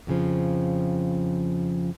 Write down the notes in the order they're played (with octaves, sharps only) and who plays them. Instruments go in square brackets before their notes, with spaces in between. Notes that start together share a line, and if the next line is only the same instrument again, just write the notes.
[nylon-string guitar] F2 C#3 F3